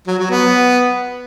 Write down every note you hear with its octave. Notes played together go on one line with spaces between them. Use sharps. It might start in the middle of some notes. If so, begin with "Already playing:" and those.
F#3
F#3
B3